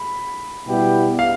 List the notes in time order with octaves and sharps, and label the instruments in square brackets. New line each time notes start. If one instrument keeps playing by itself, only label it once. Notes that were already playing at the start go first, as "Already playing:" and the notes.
Already playing: [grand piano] B5
[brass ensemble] B2 G3 B3 E4 G4
[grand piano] F5